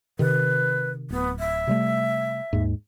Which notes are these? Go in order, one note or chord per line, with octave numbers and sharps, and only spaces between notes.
C3 D#3 B4
D1 B3
E5
C3 G3 A3
D#2 G#2